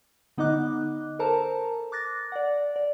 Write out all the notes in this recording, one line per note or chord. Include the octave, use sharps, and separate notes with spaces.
D3 B3 D#4 D#5 D6 F#6
A4 A#4 C5 A5 A#5
D6 F#6 A6 A#6
D5 F#5
D5